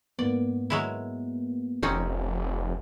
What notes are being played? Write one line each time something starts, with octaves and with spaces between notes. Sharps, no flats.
G#2 A#3 B3 D5
F#3 G#3 E4
F1 C4 C#4 D#4